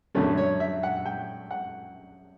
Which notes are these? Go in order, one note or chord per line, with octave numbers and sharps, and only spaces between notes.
F#2 D3 A3 C#4
C#5
E5
F#5
G5
F#5